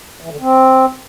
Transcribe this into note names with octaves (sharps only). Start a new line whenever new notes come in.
E3
D3
C4